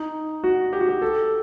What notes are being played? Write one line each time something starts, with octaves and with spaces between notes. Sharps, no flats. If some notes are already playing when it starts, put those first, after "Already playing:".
Already playing: D#4
F#4
G4
F#4
G4
A4